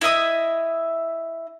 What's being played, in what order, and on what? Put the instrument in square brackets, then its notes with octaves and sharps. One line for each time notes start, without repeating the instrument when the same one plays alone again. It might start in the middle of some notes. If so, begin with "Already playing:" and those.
[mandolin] E4 D#5 E5 D#6